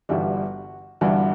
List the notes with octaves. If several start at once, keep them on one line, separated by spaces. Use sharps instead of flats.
G1 G2 E3 G3 F#4
G1 G2 E3 G3 F#4